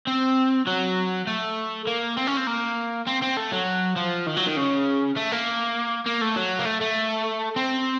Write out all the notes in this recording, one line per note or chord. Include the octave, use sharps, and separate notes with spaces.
C4
F#3
A3
A#3
C4
C#4
C4
A#3
C4
C4
A3
F#3
F3
D#3
F#3
D#3
C#3
A3
A#3
A#3
A3
F#3
A#3
A3
A3
C4